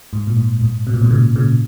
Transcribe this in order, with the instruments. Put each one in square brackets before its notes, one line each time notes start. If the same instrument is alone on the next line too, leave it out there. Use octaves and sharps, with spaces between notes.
[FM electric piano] G#2
A#2
G#2
G#2
B2
A#2
G#2 B2
A#2 C#3
A#2 C#3